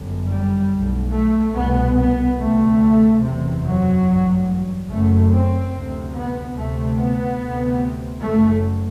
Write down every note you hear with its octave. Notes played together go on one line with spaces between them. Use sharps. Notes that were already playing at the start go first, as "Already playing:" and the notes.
Already playing: G1 F#2
G3
B1 A2
A3
C2 B2 B3
B3
D2 C3 A3
F#1 E2 C3
F#3
A1 G2
F#1 F#2 A3
C4
D2 C3
B3
D2 C3 A3
B3
D2 C3
F#1 F#2 A3